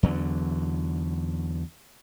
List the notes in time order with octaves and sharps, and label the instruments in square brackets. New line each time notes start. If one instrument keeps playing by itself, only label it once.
[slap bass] E2 D3 F#3